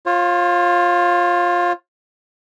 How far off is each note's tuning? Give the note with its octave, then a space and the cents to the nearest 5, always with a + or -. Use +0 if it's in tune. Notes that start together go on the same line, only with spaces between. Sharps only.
F4 +10 C#5 -40